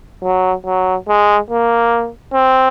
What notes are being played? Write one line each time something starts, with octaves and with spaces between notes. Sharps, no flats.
F#3
F#3
G#3
A#3
C4